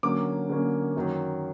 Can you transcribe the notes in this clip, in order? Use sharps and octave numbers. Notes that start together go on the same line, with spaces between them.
D3 F#3 A#3 C#4 D6
D3 F#3 A#3 C#4
F#2 D#3 F#3